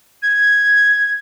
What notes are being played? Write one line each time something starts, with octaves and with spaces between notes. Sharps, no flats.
G#6